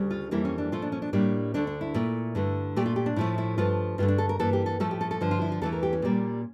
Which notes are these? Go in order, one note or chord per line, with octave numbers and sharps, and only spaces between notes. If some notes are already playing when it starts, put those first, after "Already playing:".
Already playing: D2 C#3 G3
F4
F2 E3 G3 A#3 E4
C#4
D4
A#2 F3 A3 F4
D4
C#4
D4
A2 G3 A#3 D4
D2 D3 A3 D4
D4
E4
A#2 A3
G2 D3 A3
A#2 A3 G4
F4
G4
D4
A2 F3 A3 E4
E4
G2 F3 A3 F4
G2 D3 A3 F4
D4
A4
A#4
G2 E3 A#3 A4
G4
A4
A2 F3 A3 A4
G4
A4
A4
G2 D3 F3
F4
E4
F4
E2 E3 A3 A4
A#4
G4
C#4
A#2 G3 A#3